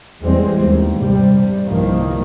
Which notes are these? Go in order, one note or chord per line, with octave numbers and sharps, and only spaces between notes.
E2 G3 G#3 C4
D#2
G2 C3 G3
C2 G2 D#3 F3 A#3